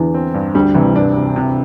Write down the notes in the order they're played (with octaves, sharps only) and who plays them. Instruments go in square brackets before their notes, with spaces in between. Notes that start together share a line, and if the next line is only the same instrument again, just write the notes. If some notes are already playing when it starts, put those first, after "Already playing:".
Already playing: [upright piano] E2 D3 E3
[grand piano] C4
G2
[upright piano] D2 D3 [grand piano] G3
[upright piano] C2 C3 [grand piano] E3
[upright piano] G2 [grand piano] D4
[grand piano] C3
C3